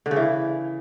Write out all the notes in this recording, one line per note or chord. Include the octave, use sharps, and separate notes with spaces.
D3
C#3
E3